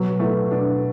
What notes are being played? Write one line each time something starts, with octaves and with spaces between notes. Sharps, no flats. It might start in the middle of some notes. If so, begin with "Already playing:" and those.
Already playing: B2 F#3
A3 B3 E4
B2 D4